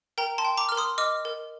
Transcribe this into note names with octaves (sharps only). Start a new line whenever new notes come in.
A#4 G5 A#5
A5 C6
G5
A#5 D6
A#4 F6
C6 D#6
D#5 D6 F6
A#4